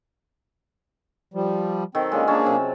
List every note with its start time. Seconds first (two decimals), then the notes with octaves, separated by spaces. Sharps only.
1.34 F3 G3
1.95 D#3 F#3 C4 A4
2.12 D3 F3 G#3 A#3 C#4
2.27 A#3 C#4 D4 G#4 A5
2.46 C3 F#3